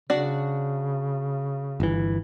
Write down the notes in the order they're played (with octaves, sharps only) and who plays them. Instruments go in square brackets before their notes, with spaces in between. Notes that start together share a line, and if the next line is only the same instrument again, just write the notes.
[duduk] C#3 [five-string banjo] D4 F#4 D5
[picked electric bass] G1 E3